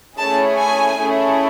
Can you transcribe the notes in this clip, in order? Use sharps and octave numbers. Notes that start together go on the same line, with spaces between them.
A3 C#4 E4 G#4 A5
G#5
A3 C#4 E4 G#4